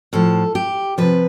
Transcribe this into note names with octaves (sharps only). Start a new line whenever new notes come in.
A2 F3 A4
G4
C3 F3 B4